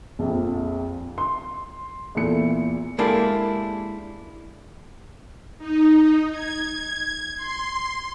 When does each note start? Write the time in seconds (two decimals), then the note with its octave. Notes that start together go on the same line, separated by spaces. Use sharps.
0.19 A#1 F2
1.18 C6
2.15 E2 A#2 E4 A4 C#7
2.98 G#3 A#3 D4 E4 G4 A4
5.58 D#4
6.31 G#6
7.36 C6